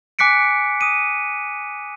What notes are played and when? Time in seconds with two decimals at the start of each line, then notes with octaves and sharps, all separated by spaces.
0.19 G#5 D6 F#6 B6 C#7 D7
0.81 D#6 D#7